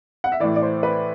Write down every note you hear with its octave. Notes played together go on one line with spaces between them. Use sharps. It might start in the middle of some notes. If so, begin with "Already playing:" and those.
F#5
E5
A2 E3 D5
D5
C5
B4